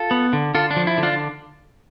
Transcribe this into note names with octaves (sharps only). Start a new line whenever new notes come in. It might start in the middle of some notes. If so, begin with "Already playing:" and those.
Already playing: F4 A4
B3
D3
D3 F4 A4
D4
F3
E4
D3
D4 F4